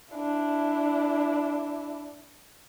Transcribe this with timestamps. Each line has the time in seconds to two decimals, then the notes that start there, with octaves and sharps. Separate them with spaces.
0.15 D4 E4